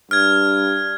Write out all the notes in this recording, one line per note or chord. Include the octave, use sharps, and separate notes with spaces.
G2 F6 G#6